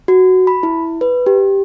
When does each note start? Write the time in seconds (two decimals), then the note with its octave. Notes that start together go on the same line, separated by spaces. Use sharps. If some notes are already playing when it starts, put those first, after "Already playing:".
0.08 F#4
0.47 B5
0.63 E4
1.01 B4
1.27 G4